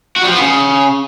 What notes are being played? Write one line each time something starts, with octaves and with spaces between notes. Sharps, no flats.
F#4
G3
F3
B3
C#3